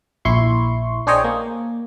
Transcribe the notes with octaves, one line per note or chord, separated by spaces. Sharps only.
A#1 E4 C6 C#6
D4 G#4 C5 C#5 D#5 G5
A#3